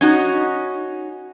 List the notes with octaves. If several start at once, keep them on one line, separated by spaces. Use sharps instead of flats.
C#4 D#4 F#4